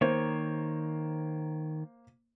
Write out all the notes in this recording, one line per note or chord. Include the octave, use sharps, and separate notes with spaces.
D#3 A#3 C5 C#5